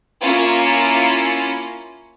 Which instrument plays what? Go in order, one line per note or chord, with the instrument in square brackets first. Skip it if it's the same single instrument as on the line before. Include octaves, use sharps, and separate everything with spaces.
[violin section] A#3 C#4 E4 F4